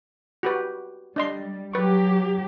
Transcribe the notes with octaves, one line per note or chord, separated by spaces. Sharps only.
F#4 G4 B4
G3 D4 D#5 C6
F#3 G4 B4 C#6